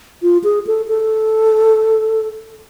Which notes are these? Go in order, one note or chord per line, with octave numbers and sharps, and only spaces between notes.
F4
G#4
A4
A4